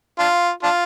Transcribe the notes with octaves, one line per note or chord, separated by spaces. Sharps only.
D4 F4
D4 F4